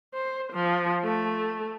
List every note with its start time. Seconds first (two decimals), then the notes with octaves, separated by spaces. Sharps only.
0.14 C5
0.52 F3
1.04 A3